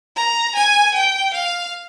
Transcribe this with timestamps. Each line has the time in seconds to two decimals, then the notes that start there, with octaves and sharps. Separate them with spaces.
0.16 A#5
0.55 G#5
0.94 G5
1.34 F5